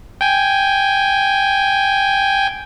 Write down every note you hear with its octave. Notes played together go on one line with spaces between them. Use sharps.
G5 G#5